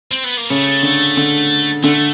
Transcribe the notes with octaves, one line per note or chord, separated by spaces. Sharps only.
C4
B3
A#3
C#3 A3
D3
D3
D3 A3